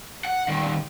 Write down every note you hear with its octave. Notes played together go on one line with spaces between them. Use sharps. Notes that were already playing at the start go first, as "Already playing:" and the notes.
F#5
D#3 G3